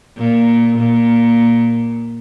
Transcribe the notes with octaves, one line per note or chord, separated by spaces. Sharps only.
A#2
A#2